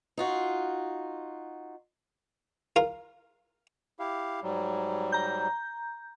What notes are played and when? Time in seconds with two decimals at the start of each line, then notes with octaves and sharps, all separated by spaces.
0.17 D#4 F4 F#4
2.76 F4 A#4 F5
3.99 E4 G4 F5
4.42 G#2 F#3 G3
5.12 A#5 G6